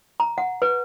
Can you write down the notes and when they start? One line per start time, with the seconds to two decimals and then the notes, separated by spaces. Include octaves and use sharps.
0.20 A#5
0.38 F#5
0.62 B4